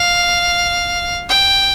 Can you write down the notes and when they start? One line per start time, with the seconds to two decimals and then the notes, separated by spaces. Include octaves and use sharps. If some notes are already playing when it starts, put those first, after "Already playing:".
Already playing: F5
1.29 G5